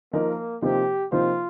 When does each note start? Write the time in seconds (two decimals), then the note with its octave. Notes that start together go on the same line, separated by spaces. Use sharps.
0.13 F3 A#3 D#4 A#4 D#5
0.62 C3 F3 A#3 D#4 G4 C5
1.12 C3 F3 A#3 D#4 F4 C5